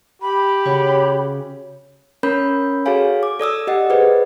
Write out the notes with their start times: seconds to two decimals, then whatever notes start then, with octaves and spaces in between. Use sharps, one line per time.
0.22 G4 B5
0.66 C#3 F#4 C#5
2.23 C#4 A#4 C#5 B5 G6
2.86 F#4 G#4 A4 C#5 F5 G#5
3.23 D6
3.39 A4 D5 D#6 E6
3.67 G4 D#5 F#5
3.90 G#4 B4 C5 D5